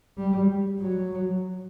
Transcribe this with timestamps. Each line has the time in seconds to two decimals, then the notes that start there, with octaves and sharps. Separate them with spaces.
0.18 G3
0.79 F#3